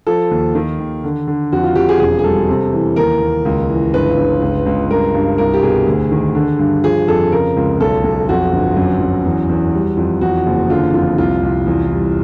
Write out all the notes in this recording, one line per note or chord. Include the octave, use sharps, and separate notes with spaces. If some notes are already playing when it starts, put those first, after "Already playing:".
F3 A4
D#2
D#3
D#2
D3
D3
F2 F#4
F4
F2 G4
G#4
E1 G#4
G#4
G3 A4
C3
E3
D#2 A#4
D#2
C#2
E3
G1 B4
G1
C#2
C#2
G2 A#4
G2
C2 A#4
G4
B2 G#4
D2
D#3
D3
G2
F3 G#4
F2 A4
C#3 A#4
C#2
B1 A4
B1
F2 F#4
G1
F#2
F#2
E2
E2
G3
F2
E2 F#4
F#1
D3 F4
F2 F4
C2 F4
C2
E2
G3